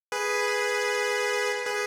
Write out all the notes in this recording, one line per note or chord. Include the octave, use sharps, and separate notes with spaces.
G#4 B4
G#4 B4